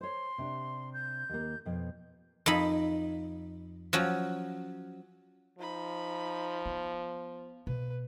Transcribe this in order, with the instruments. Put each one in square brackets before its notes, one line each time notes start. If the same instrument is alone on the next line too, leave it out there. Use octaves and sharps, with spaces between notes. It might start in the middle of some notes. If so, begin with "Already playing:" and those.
[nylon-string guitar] C5 C#5 [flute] C6
[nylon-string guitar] C3 D4
[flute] G6
[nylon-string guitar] D#2 A#3
F2 B2
[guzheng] F2 D#4 B5
F3 F#3 C#4
[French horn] F3 [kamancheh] D#4 B5
[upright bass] B3
[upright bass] B2 [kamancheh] B4